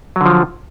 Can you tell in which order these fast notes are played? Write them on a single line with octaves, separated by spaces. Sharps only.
F#3 D3 F3